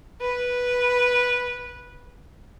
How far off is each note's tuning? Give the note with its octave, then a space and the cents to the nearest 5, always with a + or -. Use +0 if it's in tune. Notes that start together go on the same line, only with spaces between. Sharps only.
B4 -10